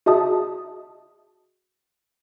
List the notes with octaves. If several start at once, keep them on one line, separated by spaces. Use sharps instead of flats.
F#4 G#4 D#5 E5 A5 D#6